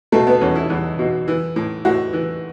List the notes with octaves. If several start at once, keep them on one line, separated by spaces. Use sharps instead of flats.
B2 A3
B3
E2 C#4
E4
E2
B2
E3
A2
A2 F#4
E3